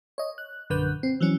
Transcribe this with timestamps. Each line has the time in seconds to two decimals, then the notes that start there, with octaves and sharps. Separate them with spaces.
0.18 C#5 D#5
0.38 F#6
0.70 A#1 F#2 D3 B4 F#6 G6
1.03 C4
1.20 E3 F#3 C#4